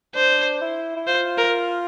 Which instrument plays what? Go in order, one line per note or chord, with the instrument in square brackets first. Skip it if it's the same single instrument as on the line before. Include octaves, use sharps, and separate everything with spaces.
[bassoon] D4 [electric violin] C5
[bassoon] E4
E4
[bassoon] F4 [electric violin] C5
[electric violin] A#4